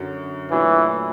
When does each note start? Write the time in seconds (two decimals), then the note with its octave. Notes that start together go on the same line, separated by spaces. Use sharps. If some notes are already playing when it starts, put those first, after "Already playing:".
Already playing: F#2 D3 F#3
0.51 A#2 E3 F#3 A3 D4